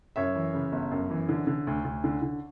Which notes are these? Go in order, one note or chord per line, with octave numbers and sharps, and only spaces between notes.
F#2 C#5 E5
E3
C#3
G1
F#2
E3
D3
D3
D2
D2
D3
D3